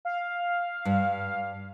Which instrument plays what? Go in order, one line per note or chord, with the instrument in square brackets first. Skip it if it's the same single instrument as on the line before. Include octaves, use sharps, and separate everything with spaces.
[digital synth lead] F5
[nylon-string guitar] G2